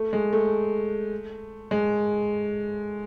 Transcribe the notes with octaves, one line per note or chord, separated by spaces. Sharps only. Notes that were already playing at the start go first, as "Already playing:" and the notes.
Already playing: A3
G#3
A3
G#3